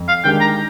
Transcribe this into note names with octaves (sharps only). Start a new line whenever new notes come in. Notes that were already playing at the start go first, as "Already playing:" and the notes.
Already playing: F2
F5
D#3 G#3 D4 G4 G5
A#5